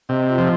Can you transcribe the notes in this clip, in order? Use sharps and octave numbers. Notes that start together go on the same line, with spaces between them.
C3 D#5
F4
F3